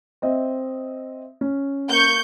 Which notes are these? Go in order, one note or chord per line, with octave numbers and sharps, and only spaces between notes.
C4 D#5 E5
C#4
A#3 C#6 G6